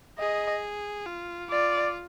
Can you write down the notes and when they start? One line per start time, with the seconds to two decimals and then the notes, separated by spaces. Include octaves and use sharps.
0.19 G#4 D#5
1.06 F4
1.50 F4 D5